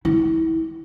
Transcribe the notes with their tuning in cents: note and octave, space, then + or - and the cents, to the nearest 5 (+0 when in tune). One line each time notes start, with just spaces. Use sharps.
E4 -25